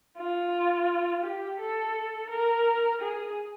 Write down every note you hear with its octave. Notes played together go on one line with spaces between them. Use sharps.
F4
G4
A4
A#4
G#4